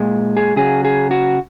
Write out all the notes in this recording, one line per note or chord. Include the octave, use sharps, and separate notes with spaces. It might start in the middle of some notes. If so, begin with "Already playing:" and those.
Already playing: A#2 G#3
G#4
C#3 F#3 G#4
G#4
F#4